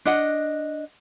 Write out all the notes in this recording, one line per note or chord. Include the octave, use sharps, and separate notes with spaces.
D4 D#5 F#5